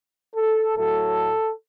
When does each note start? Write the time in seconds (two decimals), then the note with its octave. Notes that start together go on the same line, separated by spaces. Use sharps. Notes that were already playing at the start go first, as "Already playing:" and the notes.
0.36 A4
0.76 A2 F#3 A3 A4